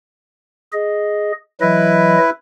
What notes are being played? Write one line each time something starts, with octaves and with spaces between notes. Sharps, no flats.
G#4 D#5
E3 F#3 E4 B4 D#5